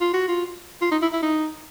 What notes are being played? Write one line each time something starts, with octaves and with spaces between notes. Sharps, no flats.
F4
F#4
F4
F4
D#4
E4
E4
D#4